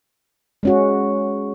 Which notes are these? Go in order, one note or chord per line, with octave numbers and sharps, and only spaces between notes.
G#3 C#4 F#4